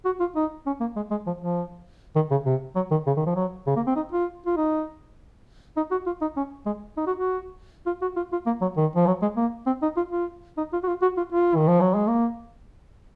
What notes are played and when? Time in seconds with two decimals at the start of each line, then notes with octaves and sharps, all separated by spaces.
0.05 F#4
0.20 F4
0.36 D#4
0.66 C#4
0.80 A#3
0.96 G#3
1.11 G#3
1.27 F3
1.41 F3
2.16 D#3
2.31 C#3
2.46 C3
2.76 F#3
2.91 D#3
3.07 C#3
3.17 D#3
3.26 F3
3.36 F#3
3.67 C#3
3.76 A#3
3.87 C4
3.96 D#4
4.12 F4
4.46 F4
4.57 D#4
5.77 D#4
5.91 F#4
6.06 F4
6.21 D#4
6.37 C#4
6.66 G#3
6.97 D#4
7.07 F#4
7.17 F#4
7.86 F4
8.02 F#4
8.16 F4
8.32 F4
8.46 A#3
8.61 F#3
8.77 D#3
8.96 F3
9.07 F#3
9.22 G#3
9.37 A#3
9.67 C4
9.82 D#4
9.97 F4
10.12 F4
10.57 D#4
10.73 F4
10.83 F#4
10.88 F4
11.02 F#4
11.17 F4
11.32 F4
11.56 D#3
11.68 F3
11.81 F#3
11.95 G#3
12.07 A#3